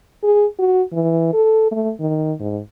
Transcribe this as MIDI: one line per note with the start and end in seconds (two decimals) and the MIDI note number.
0.23 0.45 68
0.59 0.82 66
0.93 1.30 52
1.33 1.69 69
1.71 1.91 57
2.00 2.33 51
2.40 2.59 44